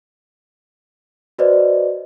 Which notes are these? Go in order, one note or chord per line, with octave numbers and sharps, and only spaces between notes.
F#4 B4 C5 D5 D#5